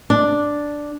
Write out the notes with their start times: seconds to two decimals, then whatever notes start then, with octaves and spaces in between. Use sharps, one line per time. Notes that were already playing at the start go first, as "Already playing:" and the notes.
0.10 D4